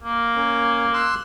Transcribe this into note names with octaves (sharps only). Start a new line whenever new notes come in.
A#3
C#4 A#4
C6 E6 F#6